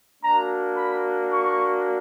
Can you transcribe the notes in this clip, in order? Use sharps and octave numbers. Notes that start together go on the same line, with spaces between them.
A#3 D4 F#4 A#5
B5
C#6